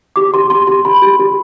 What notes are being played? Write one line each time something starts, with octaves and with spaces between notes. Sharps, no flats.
G4 D6
G4 C6
G4 C6
G4 C6
G4 B5
G4
G4